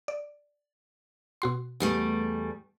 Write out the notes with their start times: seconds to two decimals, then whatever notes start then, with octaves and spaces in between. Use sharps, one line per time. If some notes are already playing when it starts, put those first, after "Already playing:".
0.08 D5
1.42 B2 F#4 C6
1.80 E2 G3 A3